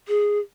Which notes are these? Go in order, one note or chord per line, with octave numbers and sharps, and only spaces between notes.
G#4